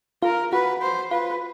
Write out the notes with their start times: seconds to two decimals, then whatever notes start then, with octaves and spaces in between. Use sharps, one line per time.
0.22 F4 A#4
0.52 F#4 B4
0.82 C5
1.11 F4 B4